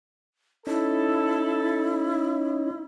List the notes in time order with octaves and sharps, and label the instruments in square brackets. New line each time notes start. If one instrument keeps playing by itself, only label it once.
[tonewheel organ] C#4 D#4 [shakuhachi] E4 [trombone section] A4